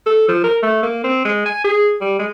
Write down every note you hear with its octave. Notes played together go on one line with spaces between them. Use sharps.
A4
F3
A#4
A3
A#3
C4
G#3
G#5
G#4
G3
G#3